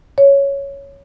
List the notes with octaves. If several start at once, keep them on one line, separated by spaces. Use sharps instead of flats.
C#5